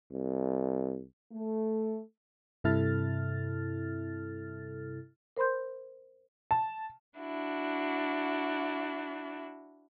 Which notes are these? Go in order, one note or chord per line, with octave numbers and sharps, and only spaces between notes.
C2
A3
G2 C3 E4 A4 F6 A6
A#4 C5 B5 C6 G6
A5
D4 E4 F#4